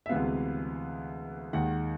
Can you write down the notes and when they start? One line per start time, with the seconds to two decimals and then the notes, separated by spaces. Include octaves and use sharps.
0.06 E5
0.09 D2 C3 E3 G#3 B3 F5
1.53 D#2 D#3 G#3 F#5